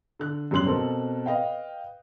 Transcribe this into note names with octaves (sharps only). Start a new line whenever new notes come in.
D3 F#6
F#2 G3 C#4 C6 F#6 F#7
B2 C4 A4 A#4
B4 D#5 F5 G5